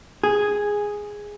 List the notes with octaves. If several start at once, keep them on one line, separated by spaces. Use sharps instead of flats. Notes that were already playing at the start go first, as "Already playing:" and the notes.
G#4